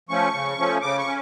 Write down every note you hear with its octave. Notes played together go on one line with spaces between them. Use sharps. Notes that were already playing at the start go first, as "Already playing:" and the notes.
F3 A3 C#4 C#6
C#3
F3 A3 C#4
C#3 D6
C#6
C#4